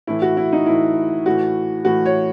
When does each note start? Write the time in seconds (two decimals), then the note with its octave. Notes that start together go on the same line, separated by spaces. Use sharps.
0.07 A2 E3 E4
0.22 F#4
0.37 E4
0.53 D#4
0.66 A2 E3 E4
1.26 A2 E3 F#4
1.85 A2 E3 F#4
2.06 C#5